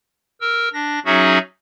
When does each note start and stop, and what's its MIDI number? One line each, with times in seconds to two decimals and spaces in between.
0.41 0.69 70
0.41 0.69 88
0.73 0.99 62
0.73 0.99 94
1.05 1.38 54
1.05 1.38 61
1.05 1.38 63
1.05 1.38 66
1.05 1.38 68
1.05 1.38 76